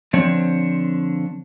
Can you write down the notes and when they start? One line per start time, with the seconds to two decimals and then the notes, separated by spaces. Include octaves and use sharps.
0.13 D3 F3 C4 D4 C#5